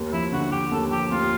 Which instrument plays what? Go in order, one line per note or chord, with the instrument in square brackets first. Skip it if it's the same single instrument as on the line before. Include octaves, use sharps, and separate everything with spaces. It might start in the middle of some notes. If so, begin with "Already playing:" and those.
Already playing: [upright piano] D#2
[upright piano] F3 [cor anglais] E4
[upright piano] D3 [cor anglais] F#4
[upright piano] F3 [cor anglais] G4
[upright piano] D#2 [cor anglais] A4
[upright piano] F3 [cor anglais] G4
[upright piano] D#2 [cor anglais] F4